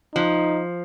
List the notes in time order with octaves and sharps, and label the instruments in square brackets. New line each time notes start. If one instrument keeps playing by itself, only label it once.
[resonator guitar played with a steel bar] F3 [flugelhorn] D#4